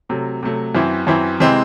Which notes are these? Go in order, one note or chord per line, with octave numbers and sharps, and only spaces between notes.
C3 F#3 A3
C3 F#3 A3
F#2 E3 C4 E4
F#2 E3 C4 E4
C3 E3 G#3 C4